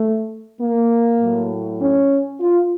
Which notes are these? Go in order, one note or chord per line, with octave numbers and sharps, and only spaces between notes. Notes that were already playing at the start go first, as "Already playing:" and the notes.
Already playing: A3
A#3
A2 F#3
C#4
F4